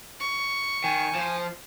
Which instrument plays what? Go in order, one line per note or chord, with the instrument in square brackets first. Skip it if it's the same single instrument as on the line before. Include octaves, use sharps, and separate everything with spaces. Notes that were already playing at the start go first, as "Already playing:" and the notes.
[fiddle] C#6
[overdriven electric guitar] D#3 [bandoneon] G#5
[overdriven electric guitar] F3 C5